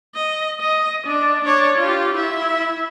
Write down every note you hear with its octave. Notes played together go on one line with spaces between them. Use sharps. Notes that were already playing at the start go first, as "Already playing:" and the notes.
D#5
D#5
D4
D4 C#5
F4 G4
E4 E5